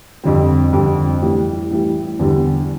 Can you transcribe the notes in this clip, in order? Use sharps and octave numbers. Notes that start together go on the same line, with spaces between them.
F2 D3 G3 C4
F2 D3 G3 C4
A2 E3 G3
A2 E3 G3
E2 D3 G3